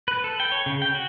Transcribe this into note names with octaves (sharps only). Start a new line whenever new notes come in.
B4
A4
G5
C#5
C#3
G5
F#4